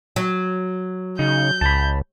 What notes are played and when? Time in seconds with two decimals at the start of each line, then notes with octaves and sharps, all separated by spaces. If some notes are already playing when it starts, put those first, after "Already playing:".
0.16 F#3
1.19 C#3 D#4 G6
1.61 C#2 A5 B5